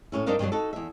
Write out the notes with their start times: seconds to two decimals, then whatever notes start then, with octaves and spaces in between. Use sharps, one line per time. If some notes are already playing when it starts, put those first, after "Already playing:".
0.12 A2 C#4 E4
0.26 G2 D4 D#4 A#4 C5 F5
0.39 G2 B2 D#3 F#3
0.52 D#4 F#4 A4
0.73 E2 E5